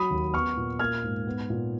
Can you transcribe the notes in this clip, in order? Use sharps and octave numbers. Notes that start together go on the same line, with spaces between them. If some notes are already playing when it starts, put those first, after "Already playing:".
Already playing: F#3 B5 D#6
D#2
B3 C#6 F6
A#2
A#3 F6 G#6
G#2
B3
A#2